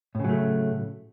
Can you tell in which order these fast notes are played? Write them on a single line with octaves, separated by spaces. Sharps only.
A2 C#3 F#3 A3